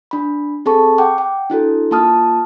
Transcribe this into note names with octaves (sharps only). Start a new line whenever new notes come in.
D4 B5
C4 G#4 A4 A5 C#6
F#5 G5 D6
G5
D4 E4 F#4 A4
A#3 F4 A5 D#6 F6